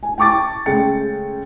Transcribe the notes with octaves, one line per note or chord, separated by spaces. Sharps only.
G#5
G5 A5 C#6 D6 A6
C#3 G#3 A3 G5 A6 C#7